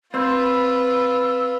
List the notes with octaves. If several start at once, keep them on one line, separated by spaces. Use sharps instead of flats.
C4 F4 B4 C5 B5 E6